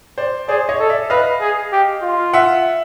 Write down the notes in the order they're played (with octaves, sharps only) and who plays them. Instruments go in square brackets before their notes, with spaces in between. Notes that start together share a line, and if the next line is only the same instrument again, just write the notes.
[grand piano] C5 D5
[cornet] G#4 [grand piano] C5 D5
[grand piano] C#5 D#5
[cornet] A4
[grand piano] D5 E5
[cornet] B4 [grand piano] D#5 F5
[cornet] G#4
G4
F4
[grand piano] E5 F#5